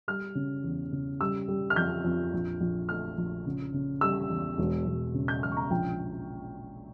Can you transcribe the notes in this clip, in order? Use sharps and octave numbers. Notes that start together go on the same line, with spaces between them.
G3 F6
C#3
E2
C#3
G3 E6
G3
F6
F2 G6
F2
A#1
A#1
A3 F6
A#1
C#3
C#3
G3 E6
E2
E1
E1
C#3
G6
E1 F6
C#6
A#5
A#1 G5